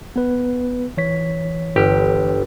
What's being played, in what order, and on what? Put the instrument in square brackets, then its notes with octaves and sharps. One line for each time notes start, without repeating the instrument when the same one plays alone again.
[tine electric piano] B3 B4
E3 C#5 B6
[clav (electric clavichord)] G1 G4